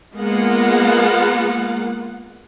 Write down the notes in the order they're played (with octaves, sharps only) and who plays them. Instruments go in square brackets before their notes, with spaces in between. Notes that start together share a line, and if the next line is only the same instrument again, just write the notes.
[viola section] G#3 A#3 B3 F4 F#5